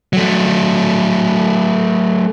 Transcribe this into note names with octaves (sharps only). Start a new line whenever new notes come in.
F#3 A3